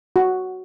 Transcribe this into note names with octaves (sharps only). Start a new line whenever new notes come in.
F#4